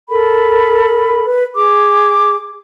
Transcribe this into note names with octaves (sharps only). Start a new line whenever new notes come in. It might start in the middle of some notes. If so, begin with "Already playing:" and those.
A4 A#4 B5
B4
G#4 D6